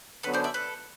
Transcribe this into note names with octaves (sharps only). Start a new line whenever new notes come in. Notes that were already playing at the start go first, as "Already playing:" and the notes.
F#2 D3 F#3 B3 D4 A4 B4
C5 D5
D5 E5
A4 B4